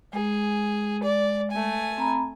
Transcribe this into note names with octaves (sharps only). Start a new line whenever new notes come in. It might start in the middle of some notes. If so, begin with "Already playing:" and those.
G#3 G#4
D5
A3 G#5
C4 A#5 B5